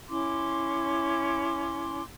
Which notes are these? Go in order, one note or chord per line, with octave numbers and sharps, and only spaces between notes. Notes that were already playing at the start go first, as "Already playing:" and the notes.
C#4 E4 C6 D6